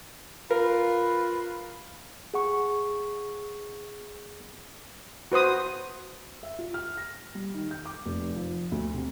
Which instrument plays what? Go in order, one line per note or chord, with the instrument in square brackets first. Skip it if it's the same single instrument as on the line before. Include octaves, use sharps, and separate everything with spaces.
[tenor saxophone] F4 [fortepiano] A#4 [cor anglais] B4
[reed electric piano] G#4 F#5 C#6
[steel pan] F#4 B4 C5 D#6
[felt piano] E5
F4
F6
A#6
G3
D#3
G6
D6
F1
F3
D2
C3